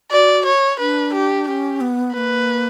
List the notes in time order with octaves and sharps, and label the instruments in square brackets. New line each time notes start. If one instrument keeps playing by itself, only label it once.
[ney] F#4 [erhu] D5
[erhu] C#5
[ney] D4 [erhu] B4
[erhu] G4
[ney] C#4 [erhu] G4
[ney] B3
[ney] B3 [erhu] B4
[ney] A#3